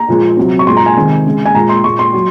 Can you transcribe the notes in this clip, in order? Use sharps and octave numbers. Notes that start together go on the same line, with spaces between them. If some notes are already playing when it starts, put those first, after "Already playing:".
Already playing: A#5
A#2 F3 G#3
C3 F#3
C#6
A#2 G#3 C6
A#5
G#5
C3 D#3 G#3
C#3 G#3
G#5
A#2 G#3 A#5
C6
A#2 G#3 C#6
C6
F#3